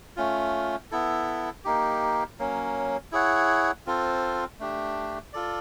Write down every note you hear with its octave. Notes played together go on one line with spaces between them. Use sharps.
A3 C#4 F4
B3 E4 A4
A#3 D#4 G4
F#3 A#3 C#4
E4 G#4 C#5 F#5
C4 F4 A4 C5
A3 D4 G4
F4 A4 D5